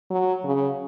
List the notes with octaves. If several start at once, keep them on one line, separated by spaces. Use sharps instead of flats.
F#3
C#3